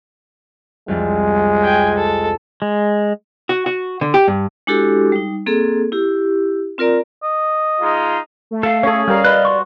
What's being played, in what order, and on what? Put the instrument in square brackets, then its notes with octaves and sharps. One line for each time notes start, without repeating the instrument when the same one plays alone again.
[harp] C2 F2 [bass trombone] G#3
[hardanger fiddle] G5 G#5
A4
[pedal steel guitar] G#3
[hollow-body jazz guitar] F#4
F#4
D3
G4
G2
[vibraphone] G#3 D4 E4 F#4 G4 A4
G3 D#4
A#3 C4 G#4 A4
E4 G4
C4 F4 A#4 D5 A#5
[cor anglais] D#5
[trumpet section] G#3 D#4 F4
[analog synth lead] A3
[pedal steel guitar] A4 [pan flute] F5
[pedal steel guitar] C#4 G#4 [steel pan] A4 C#5
[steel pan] G3 A#4 [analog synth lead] F5
[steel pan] B4 [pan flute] D5 [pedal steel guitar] D#5 F#6
[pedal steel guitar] F#4 C6 C#6